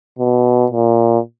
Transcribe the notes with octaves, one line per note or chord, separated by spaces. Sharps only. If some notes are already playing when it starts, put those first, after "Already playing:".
B2
A#2